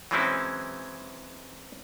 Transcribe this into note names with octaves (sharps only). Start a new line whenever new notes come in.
E3 F#3 G#3 C4 C#4 E4